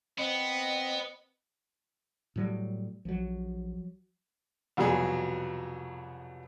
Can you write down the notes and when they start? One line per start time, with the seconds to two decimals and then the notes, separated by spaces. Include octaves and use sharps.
0.18 B3 C4 D#5
2.36 A2 F#3 G3
3.05 A#1 F3 F#3
4.77 C2 F2 B2 F#3 G#4